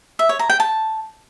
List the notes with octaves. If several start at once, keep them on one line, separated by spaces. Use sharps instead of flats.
E5
C#5
A#5
G5
A5